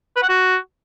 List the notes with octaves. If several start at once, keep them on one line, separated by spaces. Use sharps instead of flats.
B4
F#5
F#4